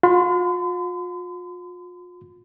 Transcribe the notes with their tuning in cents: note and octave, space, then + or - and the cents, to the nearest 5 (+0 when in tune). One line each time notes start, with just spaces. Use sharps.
F4 +40 C6 -45